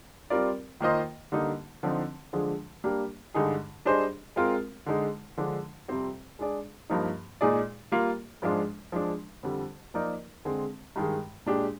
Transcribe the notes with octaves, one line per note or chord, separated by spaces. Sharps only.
G3 C4 F4 A#4 D5
D#3 A#3 F4 C5 D#5
D3 G3 A#3 D#4
D3 F3 C4 D#4
D3 F3 G#3 D4 G#4
G3 A#3 D4 G4
G2 D3 G#3 D#4 G#4
G3 D4 G#4 C5 D#5
G#3 C4 F4 A#4
D3 G#3 D#4
D3 F3 G#3 D4
F2 C3 G3 C4 G4
G#3 D4 G#4 D5
G2 F3 A#3 D#4
A#2 G#3 D#4 G#4 D5
G3 A#3 F4
G#2 F3 G#3 D4 F4
F3 G#3 D4
F2 D3 G3
F3 A#3 D#4 A#4 D5
D3 G#3 C4
G2 D#3 G#3
A#2 G#3 D4 G4